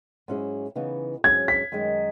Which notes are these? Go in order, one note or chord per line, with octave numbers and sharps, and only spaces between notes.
G#2 F#3 C#4 E4 G#4
C#3 E3 B3 D#4
G#2 F#3 C#4 G#4 G#6
B6
F#2 D#3 G#3 D#4